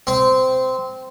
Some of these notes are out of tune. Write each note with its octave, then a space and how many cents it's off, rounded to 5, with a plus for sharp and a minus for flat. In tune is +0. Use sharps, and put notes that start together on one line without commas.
C4 -15